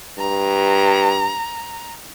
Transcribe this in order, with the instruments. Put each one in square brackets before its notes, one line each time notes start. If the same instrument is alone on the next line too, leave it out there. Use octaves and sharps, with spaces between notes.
[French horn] G2 [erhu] A#5